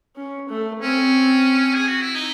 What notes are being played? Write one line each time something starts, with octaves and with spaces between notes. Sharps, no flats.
C#4
A3
C4 C#4
G#4
F#4
E4
D#4